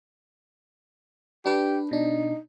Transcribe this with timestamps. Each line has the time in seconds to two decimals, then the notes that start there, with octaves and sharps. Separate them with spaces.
1.46 D4 G4 B4
1.91 B2 D4 D#4